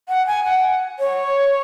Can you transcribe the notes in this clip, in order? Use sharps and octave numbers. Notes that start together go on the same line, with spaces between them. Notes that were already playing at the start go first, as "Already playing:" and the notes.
F#5
G#5
F#5
C#5